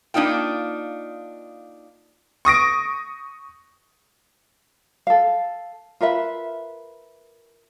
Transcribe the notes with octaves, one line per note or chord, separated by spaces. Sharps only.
A#3 D4 D#4 F4 G5
C#6 D#6 A#6 D7
A4 F5
F4 A#4 B4 E5